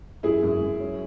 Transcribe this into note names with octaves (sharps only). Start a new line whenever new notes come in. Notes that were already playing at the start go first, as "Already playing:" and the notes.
F#2 E4 G#4
F#2
F#2
C#4